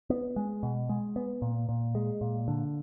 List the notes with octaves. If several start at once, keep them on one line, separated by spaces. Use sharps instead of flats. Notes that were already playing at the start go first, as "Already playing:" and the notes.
B3
G#3
B2
G#3
B3
A#2
A#2
G#3
A#2
D3